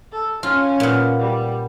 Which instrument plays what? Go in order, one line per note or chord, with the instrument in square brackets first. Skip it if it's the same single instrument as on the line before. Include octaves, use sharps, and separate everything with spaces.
[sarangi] A4
[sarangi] C#4 [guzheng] F4
[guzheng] A#2 B3
[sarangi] G3